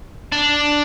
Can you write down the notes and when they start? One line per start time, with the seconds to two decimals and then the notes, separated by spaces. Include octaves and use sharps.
0.32 D4